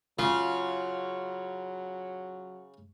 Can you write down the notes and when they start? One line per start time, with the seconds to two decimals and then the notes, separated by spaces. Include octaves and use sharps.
0.19 C#3 F#3 F4